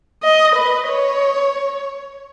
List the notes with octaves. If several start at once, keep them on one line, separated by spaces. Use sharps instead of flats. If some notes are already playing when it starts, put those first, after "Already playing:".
D#5
B4
C#5